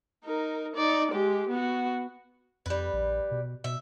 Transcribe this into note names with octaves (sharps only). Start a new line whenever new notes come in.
D#4 A#4
D#4 D5
G#3 G4
B3 F#4
F2 G3 B4
A#1
B2
B2 E5